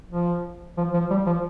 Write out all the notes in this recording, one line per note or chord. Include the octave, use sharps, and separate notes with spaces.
F3
F3
F3
G3
F3